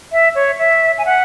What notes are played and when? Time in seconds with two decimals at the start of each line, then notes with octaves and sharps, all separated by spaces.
0.12 E5
0.35 C#5
0.59 E5
0.98 G#5
1.06 F#5